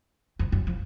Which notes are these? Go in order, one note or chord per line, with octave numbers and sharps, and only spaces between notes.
F2
F#2
F3